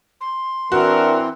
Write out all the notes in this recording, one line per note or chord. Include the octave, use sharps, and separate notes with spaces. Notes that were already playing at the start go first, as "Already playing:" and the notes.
C6
E3 C4 D4 E4 F#4 A#4